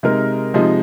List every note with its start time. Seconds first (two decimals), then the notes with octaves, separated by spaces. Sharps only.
0.03 C3 G#3 D#4 A#4
0.54 C3 F3 G#3 D#4